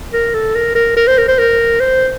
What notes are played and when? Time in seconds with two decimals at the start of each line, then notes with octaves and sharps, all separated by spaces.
0.13 A#4
0.34 A4
0.55 A#4
0.75 A#4
0.97 A#4
1.07 C5
1.18 A#4
1.28 C5
1.39 A#4
1.80 C5